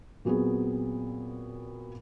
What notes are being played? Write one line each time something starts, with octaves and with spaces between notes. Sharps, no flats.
A#2 F#3 B3 C4 G#4